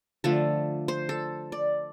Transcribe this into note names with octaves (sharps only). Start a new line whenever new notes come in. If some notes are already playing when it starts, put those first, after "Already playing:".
D3 F3 A3 A4
C5
A4
D5